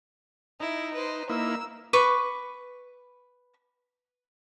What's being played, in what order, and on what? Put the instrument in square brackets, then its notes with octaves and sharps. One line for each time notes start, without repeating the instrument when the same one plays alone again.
[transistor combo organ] D#4 [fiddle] E4
[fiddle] B4 C5
[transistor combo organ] A#3 D#4 E4 [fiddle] E6
[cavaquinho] B4 C#6 D6